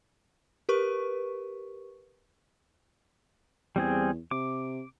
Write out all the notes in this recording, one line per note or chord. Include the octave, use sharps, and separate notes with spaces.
G4 A#4 B4 C#6
E2 G3 C4 G#4
C3 D6